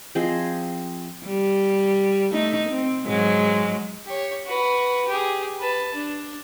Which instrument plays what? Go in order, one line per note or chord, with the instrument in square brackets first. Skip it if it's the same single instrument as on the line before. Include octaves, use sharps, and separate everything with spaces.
[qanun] F3 C4 G#4 D#5
[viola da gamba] G3
A3 D#4
C4
G#2 F#3 G#3
[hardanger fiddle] G4 C#5
F#4 B4
G4 G#4
B4 A5
D4